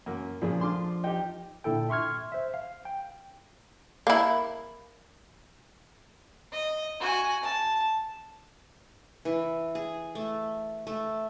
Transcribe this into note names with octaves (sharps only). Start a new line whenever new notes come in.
F#2 A#3
A#2 C#3 F3 G#4
A3 D4 F4 C6 D6
D#4 G4 G5
A#2 D3 E4 A4 G5
E5 C6 C#6 F6 G#6
C5 E5
F5
G5
A#3 E4
D#5
F#4 G#5
A5
E3
G#4
A3
A3